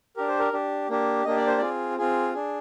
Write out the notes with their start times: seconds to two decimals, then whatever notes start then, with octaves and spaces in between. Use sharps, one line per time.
0.17 D4 G4 A#4
0.28 C5
0.39 A#4
0.53 D4 G4
0.89 A#3 D4 G4
1.25 A#3 D4 G4 D#5
1.36 D5
1.47 C5
1.58 C4 F4 G#4 D5
1.98 C4 F4 G#4
2.34 D4 G#4